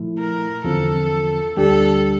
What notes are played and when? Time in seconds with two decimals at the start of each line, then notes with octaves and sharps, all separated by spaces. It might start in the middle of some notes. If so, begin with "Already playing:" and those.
Already playing: A#2 F3 A3 E4
0.19 A#4
0.64 E2 D3 F3 C4 F4 A4
1.57 D2 D3 G3 D4 G4 A4